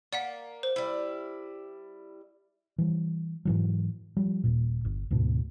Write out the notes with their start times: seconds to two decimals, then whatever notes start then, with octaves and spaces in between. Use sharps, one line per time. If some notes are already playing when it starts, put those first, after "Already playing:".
0.13 A#3 D5 F#5 B6
0.63 C5
0.76 G3 E4
2.78 E3 G3
3.45 G#2 E3 F#3
4.17 F3 G3
4.44 D#1 A#2
4.85 G1
5.11 D2 G#2 B2